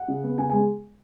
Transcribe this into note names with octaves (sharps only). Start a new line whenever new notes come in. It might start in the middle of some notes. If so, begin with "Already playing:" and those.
Already playing: F#5
C#3
B3
C#3 G#5
G#3 G#5